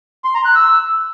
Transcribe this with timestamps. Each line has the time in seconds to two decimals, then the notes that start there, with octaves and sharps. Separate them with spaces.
0.24 C6
0.35 A#5
0.45 F#6
0.55 E6